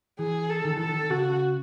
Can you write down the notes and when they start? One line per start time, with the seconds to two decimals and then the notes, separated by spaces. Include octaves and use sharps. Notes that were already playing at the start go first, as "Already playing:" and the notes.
0.19 E3 G#4
0.50 A4
0.65 D#3
0.77 E3 A4
0.89 D#3
1.10 C#3 F#4